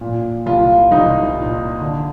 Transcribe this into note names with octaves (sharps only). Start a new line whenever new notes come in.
A#2
C2 F4
C2 D#4
A#2
D3